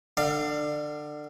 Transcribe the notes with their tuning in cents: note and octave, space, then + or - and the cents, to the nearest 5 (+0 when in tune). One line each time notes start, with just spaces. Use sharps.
D3 +25 D5 +30 F5 -15